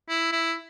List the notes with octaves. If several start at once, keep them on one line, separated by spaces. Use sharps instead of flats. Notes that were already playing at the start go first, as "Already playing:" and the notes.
E4
E4